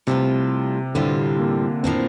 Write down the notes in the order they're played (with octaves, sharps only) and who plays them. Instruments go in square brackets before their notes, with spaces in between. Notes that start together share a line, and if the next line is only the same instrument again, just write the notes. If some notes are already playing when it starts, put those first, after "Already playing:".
[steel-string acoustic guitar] A2 G3 C4 F4 [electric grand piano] C3
[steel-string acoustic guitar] A2 G3 C4 F4 [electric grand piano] D3
[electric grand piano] A#3
[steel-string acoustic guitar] A2 F3 A#3 D4 [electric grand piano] C4